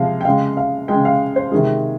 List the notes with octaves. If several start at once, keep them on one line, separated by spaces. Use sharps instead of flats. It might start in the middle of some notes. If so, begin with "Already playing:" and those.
Already playing: C3 F3 G#3 F5
G5
C#3 G#3 F5
F5
C#3 G#3 G5
F5
C5
C3 D#3 G#3 G#4